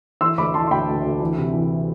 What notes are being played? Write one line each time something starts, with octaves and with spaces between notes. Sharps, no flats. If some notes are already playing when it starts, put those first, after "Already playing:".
E3 C6 E6
D2 B5 D6
E3 A5 C6
C6
D2 G5 B5
D2
D2
E3
C3
E3